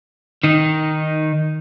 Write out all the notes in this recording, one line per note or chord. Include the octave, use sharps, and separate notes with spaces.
D#3 D#4